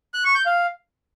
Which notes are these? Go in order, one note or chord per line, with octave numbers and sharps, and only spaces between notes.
F#6
C#6
G6
F5